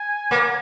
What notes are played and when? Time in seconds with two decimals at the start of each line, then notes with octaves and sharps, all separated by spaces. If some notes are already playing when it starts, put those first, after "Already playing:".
Already playing: G#5
0.31 A#3